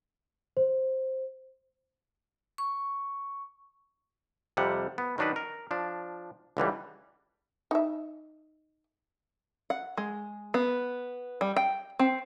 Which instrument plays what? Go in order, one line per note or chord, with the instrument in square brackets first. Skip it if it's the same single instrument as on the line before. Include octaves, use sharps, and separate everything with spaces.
[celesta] C5
[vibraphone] C#6
[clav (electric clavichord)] F2 C3 G3 F#5
B3
D#3 F#3 D4 D#4 B4
A#4
F3 D4
C#2 D3 E3 G3
[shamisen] D#4 E5
[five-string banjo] F#5
G#3
B3
G3
G5
C4